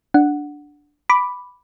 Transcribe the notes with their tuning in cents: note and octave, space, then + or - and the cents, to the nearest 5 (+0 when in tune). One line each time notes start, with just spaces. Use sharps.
D4 +0 F#5 +0
B5 +0 D6 +0